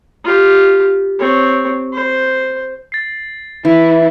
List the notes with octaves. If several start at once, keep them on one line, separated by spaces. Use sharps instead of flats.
F4 G4
C4 C#5
C5
A6 C7
E3 E4